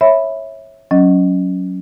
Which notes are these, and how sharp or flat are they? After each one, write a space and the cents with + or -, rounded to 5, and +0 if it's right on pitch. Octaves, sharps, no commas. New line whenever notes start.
C#5 -20 E5 -10 B5 +0
F#3 +0 C#4 +0 D#5 -5